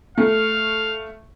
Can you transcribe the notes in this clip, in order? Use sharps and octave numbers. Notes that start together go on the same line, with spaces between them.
A3 F5